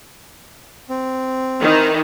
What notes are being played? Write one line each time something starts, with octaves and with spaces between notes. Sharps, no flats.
C4
D#3 E3 D#4